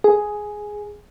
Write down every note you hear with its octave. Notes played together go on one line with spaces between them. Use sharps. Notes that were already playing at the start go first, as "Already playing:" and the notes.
G#4